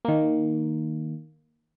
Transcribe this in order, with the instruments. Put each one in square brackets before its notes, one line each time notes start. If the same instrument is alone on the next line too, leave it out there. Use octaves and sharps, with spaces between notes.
[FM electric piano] D#3 A#3